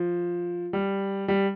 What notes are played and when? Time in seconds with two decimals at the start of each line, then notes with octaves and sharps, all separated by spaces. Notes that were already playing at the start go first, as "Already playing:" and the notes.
Already playing: F3
0.73 G3
1.28 G3